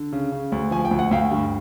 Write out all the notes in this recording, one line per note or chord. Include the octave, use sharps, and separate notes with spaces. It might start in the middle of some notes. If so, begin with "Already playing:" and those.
Already playing: D3
C#3
C#3
D2
F3 G#5
G5
D2
F#5
D2 F5 G5
G2